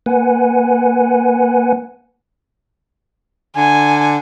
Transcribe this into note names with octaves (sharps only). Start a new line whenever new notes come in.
A#3 B4 F#5 G#5
D3 G#5